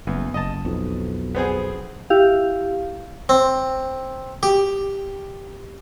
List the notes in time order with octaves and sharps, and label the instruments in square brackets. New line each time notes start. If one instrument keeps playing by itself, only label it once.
[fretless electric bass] F#1 [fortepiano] E2
[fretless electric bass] F#1 [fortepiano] D#5 A5
[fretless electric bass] B1 F2
[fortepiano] B3 C4 G#4
[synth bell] E4 G4 F5
[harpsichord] C4
G4